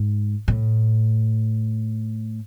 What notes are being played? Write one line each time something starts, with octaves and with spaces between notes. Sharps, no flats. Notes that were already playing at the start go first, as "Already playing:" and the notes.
Already playing: G#2
A2